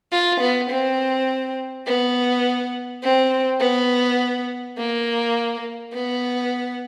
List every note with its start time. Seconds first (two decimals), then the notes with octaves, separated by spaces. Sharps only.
0.12 F4
0.40 B3
0.71 C4
1.86 B3
3.03 C4
3.61 B3
4.78 A#3
5.93 B3